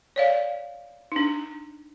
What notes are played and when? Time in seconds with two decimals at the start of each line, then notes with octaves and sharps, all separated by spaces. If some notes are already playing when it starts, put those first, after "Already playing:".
0.16 C#5 D5 F5
1.12 D4 D#4